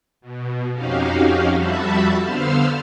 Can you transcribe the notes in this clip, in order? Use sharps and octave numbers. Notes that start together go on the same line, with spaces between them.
B2
F2 C#4 D#4 F#4 G4 F5
F2 G3 F#4 E5 A5 B5
D3 B3 C5 F5 E6 F6